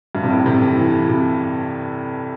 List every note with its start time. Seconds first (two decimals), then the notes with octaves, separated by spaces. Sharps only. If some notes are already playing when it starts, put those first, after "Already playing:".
0.15 G2
0.23 C3
0.30 A2
0.46 C3
0.62 E3
0.78 E3
1.09 C3